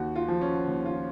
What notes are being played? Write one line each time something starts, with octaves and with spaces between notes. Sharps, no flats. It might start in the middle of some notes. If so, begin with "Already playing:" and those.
Already playing: D#2 F#4
F4
F3
C#4
D#2
F4